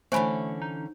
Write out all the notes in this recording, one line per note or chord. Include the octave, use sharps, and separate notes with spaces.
D3 E3 A3 C#4 C5 G#5 B5
D#4